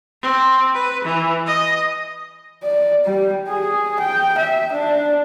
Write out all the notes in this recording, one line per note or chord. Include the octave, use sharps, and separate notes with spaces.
C4
B4
E3
D#5
D5
G3
G#4
G5
E5
D4